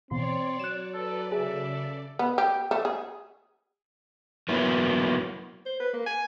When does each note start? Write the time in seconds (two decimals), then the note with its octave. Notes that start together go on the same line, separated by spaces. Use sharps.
0.11 B2 E3 C4 C#5 D5 C6
0.59 F#3 F#6 E7
0.94 A4 B4 D5
1.32 C#3 G#4 A4 D5 E5
2.19 B3
2.38 G4
2.71 A3
2.85 G#4
4.49 F#3 A#3 B3 E4
5.66 C5
5.80 B4
5.93 A#3
6.06 G#5